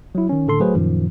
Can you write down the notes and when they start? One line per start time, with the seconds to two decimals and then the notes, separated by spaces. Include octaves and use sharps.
0.15 F#3 E4
0.29 D#3 C#4
0.47 A2 D3 A4 C6
0.60 F#3 A3 F#4 G#4 B4 C5
0.75 F#2 A#2 D#3 F3